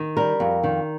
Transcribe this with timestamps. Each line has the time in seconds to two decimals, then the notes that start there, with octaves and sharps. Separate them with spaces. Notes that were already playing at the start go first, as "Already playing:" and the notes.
Already playing: D#3
0.17 G3 A#4
0.40 F2
0.64 D#3